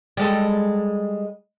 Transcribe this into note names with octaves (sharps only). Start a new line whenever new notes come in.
G3 G#3 A4